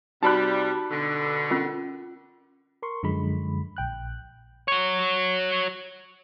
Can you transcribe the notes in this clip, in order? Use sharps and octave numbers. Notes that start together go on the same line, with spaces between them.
C3 G3 D#4 F#4 A5 B5 F#6
B2 D3
C#4 F4 A#4
A#4 C6 C#6
F#2 D3 F3 G#3 B5
A#1 G5 F#6
F#4 C#5